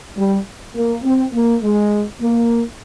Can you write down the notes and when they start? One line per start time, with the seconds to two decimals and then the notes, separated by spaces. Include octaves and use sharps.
0.17 G3
0.75 A#3
1.04 C4
1.33 A#3
1.62 G#3
2.21 A#3